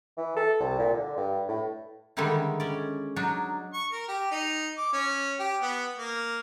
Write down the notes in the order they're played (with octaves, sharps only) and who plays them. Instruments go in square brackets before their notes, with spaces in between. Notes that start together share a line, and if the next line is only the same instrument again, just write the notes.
[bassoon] E3
A4
C2
A#2
D3
G2
A2
[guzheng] D3 D#3 G3 G#3 D#4 E4
C#4 D5
F#3 D4 D#4
[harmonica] C#6
A#4
G4
D#4
D6
C#4
G4
B3
A#3